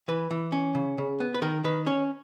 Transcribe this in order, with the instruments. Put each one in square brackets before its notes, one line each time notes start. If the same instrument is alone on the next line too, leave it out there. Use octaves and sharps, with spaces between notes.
[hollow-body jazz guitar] E3 B4
E3
C#4
C#3
C#3
B3
B4
D#3 A#4
D#3 B4
C#4 C#5